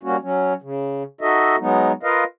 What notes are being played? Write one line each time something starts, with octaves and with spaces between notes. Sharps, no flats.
G3 A#3 C#4 F#4
F#3 C#4
C#3
D#4 F#4 A4 D#5 E5
F#3 G#3 B3 D#4
F4 A#4 B4 D#5 F5